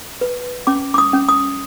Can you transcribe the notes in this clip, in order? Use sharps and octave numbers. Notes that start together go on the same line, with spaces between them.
B4
C#4 D6
D6
D#6
C#4
D#6